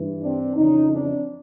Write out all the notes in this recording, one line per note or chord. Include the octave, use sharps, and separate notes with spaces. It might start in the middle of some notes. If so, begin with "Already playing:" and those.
Already playing: G2 E3
C4 D4
F2 C#3 E3 C#4 D#4
C4 D4